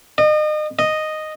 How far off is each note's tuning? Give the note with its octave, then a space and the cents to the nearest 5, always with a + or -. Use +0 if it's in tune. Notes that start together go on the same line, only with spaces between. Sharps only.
D#5 -35
D#5 -5